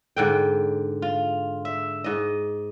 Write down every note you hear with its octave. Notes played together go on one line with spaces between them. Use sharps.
G#2 D3 G5
F4
E5
G#2 D#5